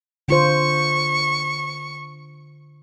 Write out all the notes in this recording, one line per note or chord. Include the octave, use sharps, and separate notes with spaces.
D3 F4 C5 C#6